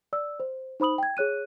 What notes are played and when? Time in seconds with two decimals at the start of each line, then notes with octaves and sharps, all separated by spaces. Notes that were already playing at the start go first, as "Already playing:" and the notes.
0.13 D5 E6
0.40 C5
0.80 D#4 C5 B5 D#6 F#7
0.98 G5 G#6
1.17 G#4 C#5 F#6 D#7